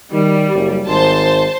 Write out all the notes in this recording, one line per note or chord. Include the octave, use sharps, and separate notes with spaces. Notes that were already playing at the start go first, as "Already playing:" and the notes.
D#3 G3
F#1
G#1 C5 A5